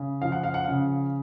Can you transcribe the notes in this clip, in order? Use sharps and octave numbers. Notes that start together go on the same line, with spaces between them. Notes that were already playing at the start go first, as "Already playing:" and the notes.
Already playing: C#3
F3 F5
F#5
F5
F#5
C#3 F5